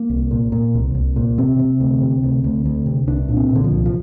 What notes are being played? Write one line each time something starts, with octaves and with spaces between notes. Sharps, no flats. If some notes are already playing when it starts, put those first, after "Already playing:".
Already playing: A#3
C2
A#2
A#2
C2
C2
A#2
C3 C4
C3
D2
C3
D2
D2
D2
C3
C2 D4
A#2
C4
A#2
D3
F3
C2
F3